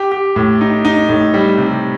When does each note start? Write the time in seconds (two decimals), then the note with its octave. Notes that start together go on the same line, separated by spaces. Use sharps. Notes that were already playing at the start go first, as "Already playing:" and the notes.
Already playing: G4
0.12 G4
0.36 A2
0.61 D#4
0.85 D#4
1.09 A2
1.34 G3
1.58 C3